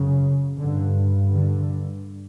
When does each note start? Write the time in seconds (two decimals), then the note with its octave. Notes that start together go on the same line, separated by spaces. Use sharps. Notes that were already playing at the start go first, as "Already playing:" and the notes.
Already playing: F#2 C#3
0.59 G2 D3
1.32 D3